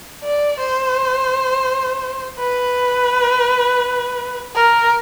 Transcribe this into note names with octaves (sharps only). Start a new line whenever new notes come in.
D5
C5
B4
A#4